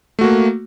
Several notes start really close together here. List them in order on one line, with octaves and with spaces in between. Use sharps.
A3 F#4 A#3